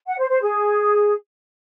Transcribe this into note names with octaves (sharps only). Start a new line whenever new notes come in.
F#5
C5
C5
G#4